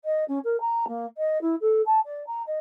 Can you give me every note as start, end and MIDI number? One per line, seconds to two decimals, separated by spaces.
0.04 0.23 75
0.28 0.38 61
0.44 0.59 70
0.60 0.84 82
0.87 1.05 58
1.17 1.40 75
1.41 1.55 64
1.60 1.81 69
1.86 1.99 81
2.05 2.22 74
2.26 2.42 82
2.46 2.59 75